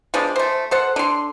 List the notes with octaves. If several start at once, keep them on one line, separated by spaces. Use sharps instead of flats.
F3 G#3 B3 D4
A3 C5
A4 C5 F#5
D3 C6